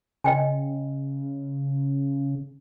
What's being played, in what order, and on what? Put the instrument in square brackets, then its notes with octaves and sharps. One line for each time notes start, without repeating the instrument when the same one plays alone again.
[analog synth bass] C#3 [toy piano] D#5 G5 G#5